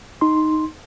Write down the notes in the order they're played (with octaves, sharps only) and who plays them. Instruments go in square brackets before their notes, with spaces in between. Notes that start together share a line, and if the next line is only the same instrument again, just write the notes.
[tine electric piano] D#4 C6